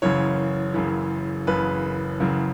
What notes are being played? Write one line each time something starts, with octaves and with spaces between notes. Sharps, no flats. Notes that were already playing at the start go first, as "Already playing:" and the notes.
F#1 F#2 C#3 E3 C#5
F#1 F#2 C#3 E3
F#1 F#2 C#3 E3 B4
F#1 F#2 C#3 E3